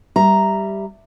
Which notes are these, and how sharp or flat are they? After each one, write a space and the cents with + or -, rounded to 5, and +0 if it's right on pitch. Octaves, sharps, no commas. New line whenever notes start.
G3 +0 E5 +0 A#5 +0